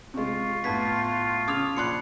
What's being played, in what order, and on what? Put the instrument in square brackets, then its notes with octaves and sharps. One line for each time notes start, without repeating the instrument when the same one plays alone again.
[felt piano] C3 G#3 [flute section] F4 C#6
[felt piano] A2 B3 [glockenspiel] A5 G#6 B6
[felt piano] C#3 D6 G#6 [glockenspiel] D#6 F6 F7
[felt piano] A#1 C6 F#6 [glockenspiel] B5 C7 C#7